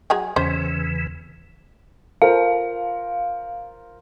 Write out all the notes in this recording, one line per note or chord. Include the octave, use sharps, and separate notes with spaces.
F#3 G#4 G#5
E2 C#3 E3 C#4 C5
F4 A#4 C5 F5